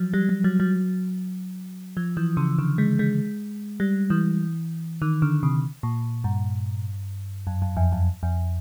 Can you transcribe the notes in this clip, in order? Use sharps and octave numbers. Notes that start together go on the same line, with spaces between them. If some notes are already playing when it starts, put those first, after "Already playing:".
Already playing: F3 F#3
G3
G3
F#3
F#3
F3
E3
C#3
D3
G#3
G#3
G3
E3
D#3
D3
C3
A#2
G2
F#2
F#2
F2
F#2
F2